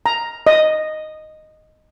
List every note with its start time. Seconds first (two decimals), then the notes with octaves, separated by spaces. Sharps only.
0.06 A#5
0.47 D#5